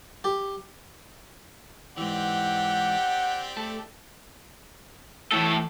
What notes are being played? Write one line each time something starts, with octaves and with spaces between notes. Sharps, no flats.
G4
G#2 E3 C4 G4 D5 F#5
A3 A4
A2 E3 A4